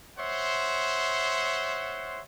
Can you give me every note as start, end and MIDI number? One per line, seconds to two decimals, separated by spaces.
0.18 2.21 72
0.18 2.21 73
0.18 2.21 76
0.18 2.21 78
0.18 2.21 84